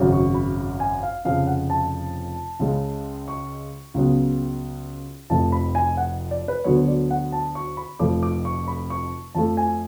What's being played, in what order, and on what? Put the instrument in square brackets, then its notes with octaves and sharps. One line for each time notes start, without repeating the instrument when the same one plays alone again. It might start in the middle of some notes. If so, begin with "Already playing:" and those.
Already playing: [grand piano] G#1 F#2 C#3
C#6
B5
G#5
F5
F1 F2 C#3 F3 F5
F#5
A5
C#2 C#3 G#3
C#6
C#2 C#3 F#3 B3
F1 F2 F3 A3 A5
B5
G#5
F#5
D5
B4
D2 D3 F#3 B3 C#5
D5
F#5
A5
C#6
B5
F1 F2 F3 A3 D6
D6
C#6
B5
C#6
F2 F3 A3 A5
G#5